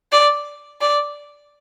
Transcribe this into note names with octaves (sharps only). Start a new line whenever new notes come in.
D5
D5